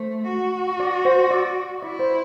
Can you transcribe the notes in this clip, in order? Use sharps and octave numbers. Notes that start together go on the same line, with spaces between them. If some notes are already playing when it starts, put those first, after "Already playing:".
Already playing: A3 C5
F#4
D5
C5
D5
E4 D5
C5